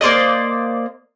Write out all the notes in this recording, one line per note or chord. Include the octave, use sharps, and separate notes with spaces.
A#3 C5 D5 D#5